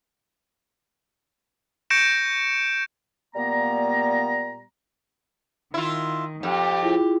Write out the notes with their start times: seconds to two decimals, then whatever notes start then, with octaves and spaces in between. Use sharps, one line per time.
1.90 C#6 G6 A#6 C#7 D7 E7
3.35 A#2 G3 A#3 B3 A#5
5.74 D#3 E4 F4
6.43 F2 G4
6.82 E4 F4 G#4